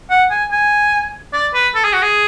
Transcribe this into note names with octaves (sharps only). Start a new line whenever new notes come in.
F#5
G#5
G#5
D5
B4
A4
G#4
F#4
G#4